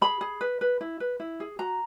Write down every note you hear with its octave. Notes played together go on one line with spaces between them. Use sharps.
G#4 B5
G#4
B4
B4
E4
B4
E4
G#4
F#4 A#5